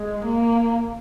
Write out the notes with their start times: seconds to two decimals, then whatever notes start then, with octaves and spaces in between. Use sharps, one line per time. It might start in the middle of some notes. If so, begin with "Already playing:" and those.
Already playing: G#3
0.25 A#3